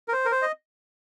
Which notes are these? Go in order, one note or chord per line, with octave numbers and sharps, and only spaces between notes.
A#4
C5
A#4
C5
D#5